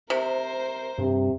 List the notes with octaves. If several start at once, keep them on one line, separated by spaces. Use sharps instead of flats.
C3 A#4 C5
G2 C3